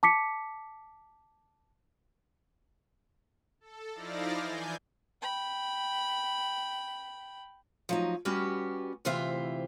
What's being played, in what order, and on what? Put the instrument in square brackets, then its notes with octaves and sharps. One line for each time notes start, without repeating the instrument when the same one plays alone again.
[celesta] A5 D6 B6 C#7
[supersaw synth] A4
F3 D#4 E4 D5 F5 A#6
E3 G#5 G6
[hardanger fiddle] G5 B5
[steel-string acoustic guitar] F3 F#3 D#4
G3 B3 C#4 F#4 G4
D2 C3 E3 F4 C5 E5